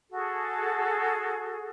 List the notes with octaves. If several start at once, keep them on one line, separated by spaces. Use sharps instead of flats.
F#4 G#4 A4